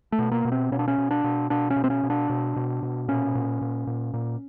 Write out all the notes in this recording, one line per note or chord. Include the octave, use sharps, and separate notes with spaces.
A3
B2
A#3
B2
C4
B2 C#4
D4
C#4
B2
D4
B2
B2 D4
C#4
B2
C4
C#4
B2
D4
B2
B2
B2
A#2 C#4
A#2
A#2
A#2
A#2